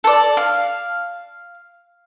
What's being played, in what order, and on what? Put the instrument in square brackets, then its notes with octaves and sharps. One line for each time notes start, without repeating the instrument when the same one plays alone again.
[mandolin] A4 D5
F5